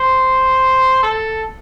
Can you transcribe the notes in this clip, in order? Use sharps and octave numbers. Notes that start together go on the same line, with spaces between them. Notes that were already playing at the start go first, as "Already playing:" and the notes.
Already playing: C5
A4